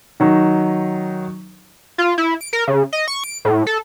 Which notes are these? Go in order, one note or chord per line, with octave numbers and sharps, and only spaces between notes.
D#3 F#3 D#4
F4
E4
D7
A#4
C#3
D#5
C#6
D7
A2
A4